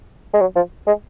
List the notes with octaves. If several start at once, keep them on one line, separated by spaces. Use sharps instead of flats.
G#3
F#3
F3
G#3